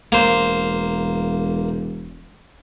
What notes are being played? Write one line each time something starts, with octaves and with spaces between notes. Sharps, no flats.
E1 A#3 C5